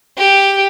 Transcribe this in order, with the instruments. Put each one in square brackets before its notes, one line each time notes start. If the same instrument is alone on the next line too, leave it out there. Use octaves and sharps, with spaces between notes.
[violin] G4